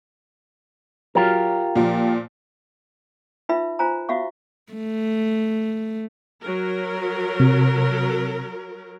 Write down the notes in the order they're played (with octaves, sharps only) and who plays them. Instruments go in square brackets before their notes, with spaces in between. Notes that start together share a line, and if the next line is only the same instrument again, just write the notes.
[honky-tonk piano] F#3 [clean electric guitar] F4 G4 A#4
[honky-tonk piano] A#2 F3
[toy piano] D#4 F4 B4 E5 B5
F4 C5 G#5 A#5
F#4 E5 F5 C#6
[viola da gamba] A3
[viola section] F#3 A#4
[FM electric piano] C3